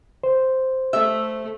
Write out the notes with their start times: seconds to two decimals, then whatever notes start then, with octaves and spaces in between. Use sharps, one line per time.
0.24 C5
0.93 A3 E5